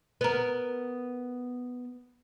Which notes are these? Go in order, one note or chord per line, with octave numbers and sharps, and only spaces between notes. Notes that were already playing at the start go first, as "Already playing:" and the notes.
B3 A#4